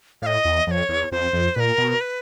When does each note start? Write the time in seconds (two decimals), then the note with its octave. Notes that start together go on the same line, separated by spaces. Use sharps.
0.22 A2 F5
0.26 D#5
0.45 E2
0.66 F2 C#5 D#5
0.89 E2
1.12 F2 C5
1.33 F2
1.55 A#2 A#4 B4
1.78 B2
2.01 B4